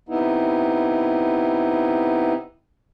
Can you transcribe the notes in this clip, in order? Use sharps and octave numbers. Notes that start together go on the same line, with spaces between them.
C3 B3 D#4 E4